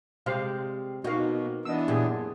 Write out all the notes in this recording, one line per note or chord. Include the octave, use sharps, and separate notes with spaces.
C3 G3 G#3 G4 C5 F5
B2 A#3 C4 D#4 F#4 D#5 F5
E3 B3 D4 D#5 E6
F#2 A#2 G4 G#4